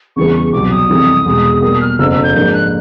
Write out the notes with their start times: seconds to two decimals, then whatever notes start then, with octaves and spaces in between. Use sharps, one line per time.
0.16 E2 C#3 E3 G3 B3 C#6
0.34 C#6
0.53 C2 B2 F#3 D6
0.71 D#6
0.90 F2 C3 E3 G3
1.25 E2 B2 G#3
1.62 B2 G3 A#3 D#6
1.81 F6
1.99 F#1 F2 D3 E6
2.11 E6
2.23 G6
2.35 G#2 F3 A#3 D4 G6
2.53 F#6